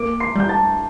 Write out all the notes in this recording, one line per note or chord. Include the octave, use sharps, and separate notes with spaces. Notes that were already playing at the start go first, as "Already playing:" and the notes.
Already playing: A#3 D6 D7
C6 C7
G3 G6
A5 A6